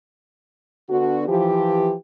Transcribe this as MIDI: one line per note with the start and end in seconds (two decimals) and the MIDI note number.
0.89 1.24 50
0.89 1.24 59
0.89 1.24 62
0.89 1.24 66
1.28 1.93 52
1.28 1.93 53
1.28 1.93 67